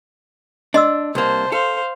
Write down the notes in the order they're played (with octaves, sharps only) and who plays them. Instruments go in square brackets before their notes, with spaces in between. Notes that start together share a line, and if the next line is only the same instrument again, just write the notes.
[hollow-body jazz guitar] D4 [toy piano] D#5 C6 E6
[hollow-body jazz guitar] C2 A#3 [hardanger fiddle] C5 A5
[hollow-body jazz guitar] A4 [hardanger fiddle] C5 F5